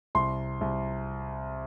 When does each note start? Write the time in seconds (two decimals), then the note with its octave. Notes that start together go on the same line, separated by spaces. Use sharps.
0.15 C2 C6
0.61 C2